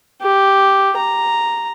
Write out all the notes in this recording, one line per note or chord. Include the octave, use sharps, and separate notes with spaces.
G4
A#5